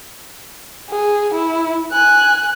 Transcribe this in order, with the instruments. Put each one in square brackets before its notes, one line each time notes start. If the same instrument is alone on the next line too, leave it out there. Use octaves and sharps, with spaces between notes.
[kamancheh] G#4
E4
G#5 F#6